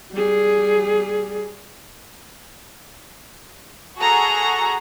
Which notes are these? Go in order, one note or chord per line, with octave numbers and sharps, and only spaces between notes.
G3 G#4
F#4 G#4 A4 F#5 A#5